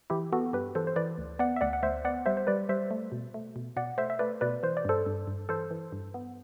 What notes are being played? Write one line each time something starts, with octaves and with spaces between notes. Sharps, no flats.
E3 E4 G4
B3 F#4 A4
G2 G4 B4
E3 A4 C5
C5
E3 B4 D5
D2
B3 D5 F#5
E5
D2 D5 F#5
F#5
D2 C5 E5
B3 D5 F#5
G3 C5 E5
C5
G3 B4 D5
G3 C5 E5
A3
B2
A3
B2
B2 D5 F#5
A3 C5 E5
E5
A3 B4 D5
B2 B4 D5
E3 C5
D5
G2 A4 C5
G2
G2
E3 A4 C5
E3
G2
B3